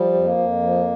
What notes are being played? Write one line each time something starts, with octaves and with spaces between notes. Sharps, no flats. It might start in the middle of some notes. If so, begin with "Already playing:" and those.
Already playing: F3 G3
F2
A#3
F2
F3